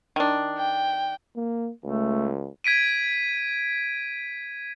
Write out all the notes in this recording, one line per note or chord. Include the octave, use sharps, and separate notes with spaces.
D#3 D4
G5
A#3
C#2 A3
G#6 B6 D7 D#7